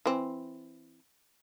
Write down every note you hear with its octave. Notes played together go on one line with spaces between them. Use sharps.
E3 C4